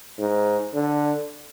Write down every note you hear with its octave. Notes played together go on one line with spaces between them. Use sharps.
G#2
D3